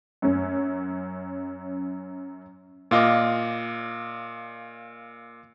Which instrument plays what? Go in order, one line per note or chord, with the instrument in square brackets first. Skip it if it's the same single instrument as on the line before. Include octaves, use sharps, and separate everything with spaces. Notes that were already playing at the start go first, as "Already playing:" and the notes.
[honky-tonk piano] F#2 C#4
[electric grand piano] A#2 F4 D#5 D6